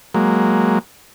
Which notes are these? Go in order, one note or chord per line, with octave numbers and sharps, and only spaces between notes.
F#3 G#3 A#3